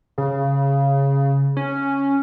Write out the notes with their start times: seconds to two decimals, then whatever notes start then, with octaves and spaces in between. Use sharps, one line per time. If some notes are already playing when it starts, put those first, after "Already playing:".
0.18 C#3
1.57 C#4